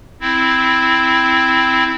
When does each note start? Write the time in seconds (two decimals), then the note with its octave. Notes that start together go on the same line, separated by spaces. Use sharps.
0.21 C4 E4